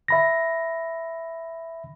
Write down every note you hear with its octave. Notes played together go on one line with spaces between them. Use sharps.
E5 B5 A#6